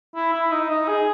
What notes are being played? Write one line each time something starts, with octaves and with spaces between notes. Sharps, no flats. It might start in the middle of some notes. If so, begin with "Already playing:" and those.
E4
E4
D#4
D#4
G#4